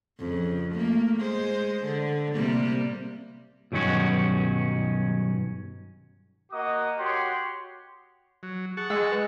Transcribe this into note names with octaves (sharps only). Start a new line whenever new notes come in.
F2 C#3
A3 A#3
G#3 C5
D3
C3 G3 A#3
B1 G2 D#3 F#3 C#4 F#4
A#3 F#4 D#5 D6 D#6
F#4 G4 C#5 F#5 G5 C6
F#3
G#4 F#5 A5 C#6
G#3 E6 A#6
B4